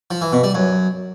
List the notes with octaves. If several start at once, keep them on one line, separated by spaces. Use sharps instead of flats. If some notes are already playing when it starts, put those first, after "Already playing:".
F3
E3
B2
G3
F#2